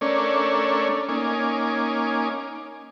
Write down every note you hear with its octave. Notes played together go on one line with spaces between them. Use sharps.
A3 C#4 D4 A#4 C#5 D5
A#3 C#4 D#4 G#5 D6